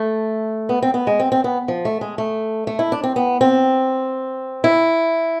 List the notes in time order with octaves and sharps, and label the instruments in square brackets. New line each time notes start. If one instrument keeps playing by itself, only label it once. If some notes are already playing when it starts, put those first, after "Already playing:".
Already playing: [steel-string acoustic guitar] A3
B3
C4
B3
G#3
C4
C4
B3
F3
A3
G#3
A3
A3
E4
D4
C4
B3
C4
E4